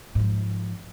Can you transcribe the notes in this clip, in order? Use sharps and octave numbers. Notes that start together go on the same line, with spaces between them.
G#2 F3